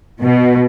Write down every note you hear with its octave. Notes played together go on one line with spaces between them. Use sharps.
B2